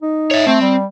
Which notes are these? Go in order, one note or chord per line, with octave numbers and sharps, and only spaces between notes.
D#4
C#5 E5
A3 C4
G3